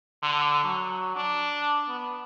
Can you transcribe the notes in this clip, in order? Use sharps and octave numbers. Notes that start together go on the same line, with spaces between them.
D3
F#3
D4
B3